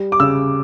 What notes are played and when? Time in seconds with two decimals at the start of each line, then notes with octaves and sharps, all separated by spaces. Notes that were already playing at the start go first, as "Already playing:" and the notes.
Already playing: G3
0.12 D6
0.20 C#3 E6